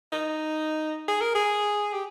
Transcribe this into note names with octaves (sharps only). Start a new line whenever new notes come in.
D#4
G#4
A#4
G#4
G4